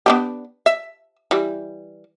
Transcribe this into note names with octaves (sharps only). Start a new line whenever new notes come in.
B3 D4 G4
E5
E3 G3